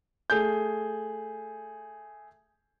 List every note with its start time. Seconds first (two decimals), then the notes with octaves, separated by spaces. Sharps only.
0.30 A3 G#4 G6